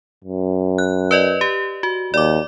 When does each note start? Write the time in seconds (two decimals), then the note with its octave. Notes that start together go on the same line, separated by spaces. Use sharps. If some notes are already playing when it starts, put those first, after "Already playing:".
0.24 F#2
0.78 F#6
1.11 B4 D5 D#5
1.41 G4
1.83 F#4
2.14 D#2 D5 D6